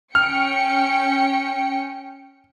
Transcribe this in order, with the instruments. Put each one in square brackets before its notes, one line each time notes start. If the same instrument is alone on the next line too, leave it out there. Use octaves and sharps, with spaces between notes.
[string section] C#4 G5 C#7 [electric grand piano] F6